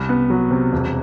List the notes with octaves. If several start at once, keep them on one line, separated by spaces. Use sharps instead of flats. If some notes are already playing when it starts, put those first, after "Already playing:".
Already playing: C2
B3
F#3
C3
E1